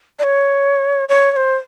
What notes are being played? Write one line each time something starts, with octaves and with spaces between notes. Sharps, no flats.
D5
C#5
C#5
C#5
C5